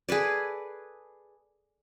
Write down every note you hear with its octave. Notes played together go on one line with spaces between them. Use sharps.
G#4 A4 B4 D5